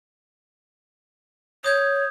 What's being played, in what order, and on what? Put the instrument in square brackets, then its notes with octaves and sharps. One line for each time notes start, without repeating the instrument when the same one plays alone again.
[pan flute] C#5 [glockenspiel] D#6 G6 G#6